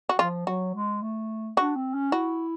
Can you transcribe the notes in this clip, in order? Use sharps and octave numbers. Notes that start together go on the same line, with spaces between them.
F#4
F3 F4
F#3 F#4
G#3
A3
D4 F#4
C4
C#4
E4 F#4